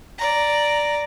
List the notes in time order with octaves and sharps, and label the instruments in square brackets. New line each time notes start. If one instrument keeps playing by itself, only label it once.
[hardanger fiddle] D5 A#5